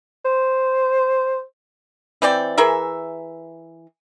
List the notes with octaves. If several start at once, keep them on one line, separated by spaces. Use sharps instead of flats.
C5
E3 C4 D5 G5
E3 G#4 A#4 E5